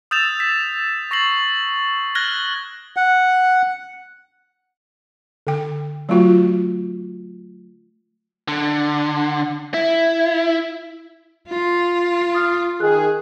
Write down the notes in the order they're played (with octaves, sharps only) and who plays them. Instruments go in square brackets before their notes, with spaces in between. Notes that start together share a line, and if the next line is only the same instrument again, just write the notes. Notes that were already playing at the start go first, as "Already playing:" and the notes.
[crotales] D#6 E6 G6 A6 E7 F7
B6
C#6 A6 A#6 C7 F#7
F6 F#6 G#6 A#6 F#7 G7
[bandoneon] F#5
[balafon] D3 G5
F#3 A3 F4 F#4
[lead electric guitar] D3
E4
[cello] F4
[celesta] D#6 F6
[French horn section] D#3 G#4 [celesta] F#6